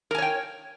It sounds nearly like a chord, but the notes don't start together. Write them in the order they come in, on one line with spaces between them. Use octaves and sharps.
A#4 G#5 C#5 G5